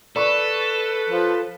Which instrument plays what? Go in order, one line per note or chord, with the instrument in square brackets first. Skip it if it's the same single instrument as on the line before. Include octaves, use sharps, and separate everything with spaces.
[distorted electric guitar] A4 [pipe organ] B4 [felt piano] D5 B5 C#6
[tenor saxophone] F3